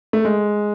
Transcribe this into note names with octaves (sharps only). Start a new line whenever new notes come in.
A3
G#3